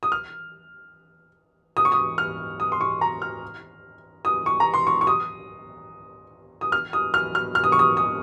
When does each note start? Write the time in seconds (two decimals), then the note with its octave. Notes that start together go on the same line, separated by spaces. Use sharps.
0.03 D#6
0.12 F6
1.77 D#6
1.85 C#6
1.92 D#6
2.18 F6
2.60 D#6
2.72 C6
2.81 C#6
3.01 A#5
3.22 F6
4.25 D#6
4.46 C#6
4.60 A#5
4.74 C6
4.87 C#6
5.01 C#6
5.07 D#6
6.61 D#6
6.72 F6
6.93 D#6
7.14 F6
7.35 F6
7.55 F6
7.64 D#6
7.72 C#6
7.79 D#6
7.97 D#6